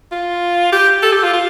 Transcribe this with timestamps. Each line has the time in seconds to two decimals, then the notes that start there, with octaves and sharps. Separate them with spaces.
0.12 F4
0.72 G4
1.02 A4
1.12 G4
1.23 F4
1.33 F4